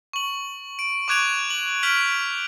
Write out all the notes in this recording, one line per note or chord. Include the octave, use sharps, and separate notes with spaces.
C#6 F#7
D7
C#6 D6 F#6 G#6 D7 F7
F#7
F6 G6 B6 D7 F7 F#7